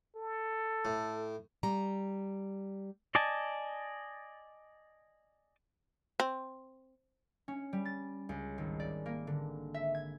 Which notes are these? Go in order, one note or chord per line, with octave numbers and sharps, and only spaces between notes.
A4
A2
G3 A#5
D5 D#5 G#5 A5
C4
C#4
G3
A6
C#2
G#1
D5
A#3
D3
E5
G#6